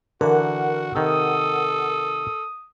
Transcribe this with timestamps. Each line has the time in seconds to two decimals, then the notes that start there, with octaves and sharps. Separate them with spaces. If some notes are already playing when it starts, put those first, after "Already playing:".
0.21 D3 E3 F#4 A#4 F#5
0.95 C3 D#3 A4 D#6